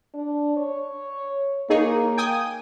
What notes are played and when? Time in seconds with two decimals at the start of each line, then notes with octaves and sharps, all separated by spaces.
0.15 D4
0.56 C#5
1.70 A#3 D#4 G#4 C#5
2.17 G5 G#5 D#6